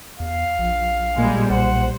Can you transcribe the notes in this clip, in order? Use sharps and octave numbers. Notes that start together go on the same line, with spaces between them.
E2 F5
A#1 F3
A#2 G3 G#3 A#3
B1 C5 F#5